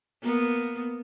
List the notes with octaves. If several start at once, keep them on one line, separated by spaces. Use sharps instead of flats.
A#3 B3